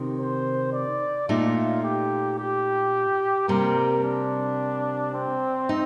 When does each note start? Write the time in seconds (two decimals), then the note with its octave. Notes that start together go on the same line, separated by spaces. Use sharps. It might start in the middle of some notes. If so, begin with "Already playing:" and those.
Already playing: C3 D#3
0.18 C5
0.73 D5
1.28 A#2 A3 D#4 F4
1.83 G4
2.38 G4
3.48 C3 G3 A#3 A#4
4.04 D4
5.14 C4
5.69 D#4